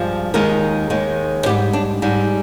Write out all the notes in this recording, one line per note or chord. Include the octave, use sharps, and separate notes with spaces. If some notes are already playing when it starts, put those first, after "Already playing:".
Already playing: G2 F3 G#3
D#2 D#3 G#3 A#4
D#2 D#3 G#3
G#2 G3 G4
D4
G#2 G3